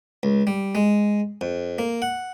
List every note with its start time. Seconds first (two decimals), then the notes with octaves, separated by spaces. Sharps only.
0.23 C#2
0.47 G3
0.75 G#3
1.41 F2
1.78 A#3
2.02 F#5